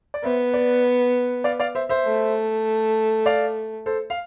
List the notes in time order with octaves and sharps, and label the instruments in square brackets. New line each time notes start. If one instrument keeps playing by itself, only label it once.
[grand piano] D5
[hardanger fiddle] B3 [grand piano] C5 E5
[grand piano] B4 D5
D5 F5
D5 F5
C5 E5
C5 E5
[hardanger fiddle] A3
[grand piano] D5 F5
A4 C5
F5